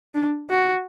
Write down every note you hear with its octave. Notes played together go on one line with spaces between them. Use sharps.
D4
F#4